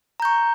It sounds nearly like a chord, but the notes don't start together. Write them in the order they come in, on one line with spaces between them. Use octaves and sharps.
A#5 G6 C#6